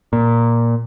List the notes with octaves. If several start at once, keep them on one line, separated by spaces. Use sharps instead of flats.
A#2